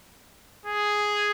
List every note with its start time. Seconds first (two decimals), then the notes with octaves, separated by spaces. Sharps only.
0.66 G#4